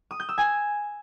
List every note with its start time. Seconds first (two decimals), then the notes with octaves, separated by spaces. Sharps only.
0.11 D#6
0.20 G6
0.29 E6
0.38 G#5